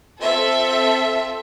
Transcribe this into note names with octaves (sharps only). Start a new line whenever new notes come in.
C4 F4 A4 E5